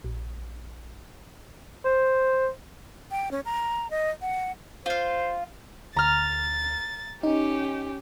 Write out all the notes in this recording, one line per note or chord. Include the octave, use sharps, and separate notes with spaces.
A#1
C5
G5
C#4
A#5
D#5
F#5
F4 C5 F5
D2 A#5 F6 A6
C#4 D#4 G4